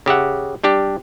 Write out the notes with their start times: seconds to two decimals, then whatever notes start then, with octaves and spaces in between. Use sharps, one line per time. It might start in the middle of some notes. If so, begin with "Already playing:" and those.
0.06 C#3 G4 E5 F#5
0.64 G3 D4 G4